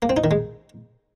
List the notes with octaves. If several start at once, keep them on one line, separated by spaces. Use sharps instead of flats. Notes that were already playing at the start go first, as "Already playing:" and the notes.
A#3
C4
D#4
D#3
G#3